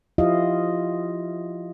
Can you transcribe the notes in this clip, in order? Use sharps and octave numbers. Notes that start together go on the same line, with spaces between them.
F3 E4 F4 G4 D#5 F5